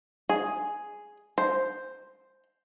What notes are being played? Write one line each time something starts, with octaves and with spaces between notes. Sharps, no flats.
G#4
C5